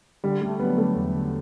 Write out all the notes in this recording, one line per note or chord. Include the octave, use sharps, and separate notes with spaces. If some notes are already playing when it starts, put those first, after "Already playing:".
D3 G3
G3 A3
F#3 B3
D3 A3
E2
D3